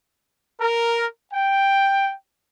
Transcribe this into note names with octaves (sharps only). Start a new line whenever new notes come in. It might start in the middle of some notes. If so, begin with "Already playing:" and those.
A#4
G5